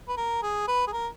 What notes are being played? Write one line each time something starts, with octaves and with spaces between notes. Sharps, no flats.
B4
A#4
G#4
B4
G#4
A#4